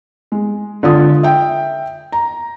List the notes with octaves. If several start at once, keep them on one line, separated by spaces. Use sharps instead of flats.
G#3
D3 F4 D#6
E5 G5
A#5